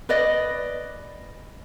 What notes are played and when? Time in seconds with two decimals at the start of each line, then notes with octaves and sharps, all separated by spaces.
0.09 B4 D5 D#5